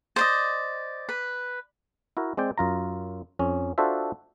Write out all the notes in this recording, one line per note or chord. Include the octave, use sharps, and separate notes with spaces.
C5 D5 D#5
B4
E4 F#4 A#4
G#3 C4 D5 G5
F#2 F4 A#5
F2 C#4
D4 F4 F#4 A4 C5 E5